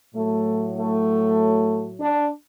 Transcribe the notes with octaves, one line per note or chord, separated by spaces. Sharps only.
A2 F#3 A3
A3
D4